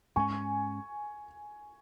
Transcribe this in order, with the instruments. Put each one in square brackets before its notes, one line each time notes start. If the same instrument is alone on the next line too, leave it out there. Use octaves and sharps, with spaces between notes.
[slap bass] G#2 G#3 C#4 [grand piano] G#5 C#6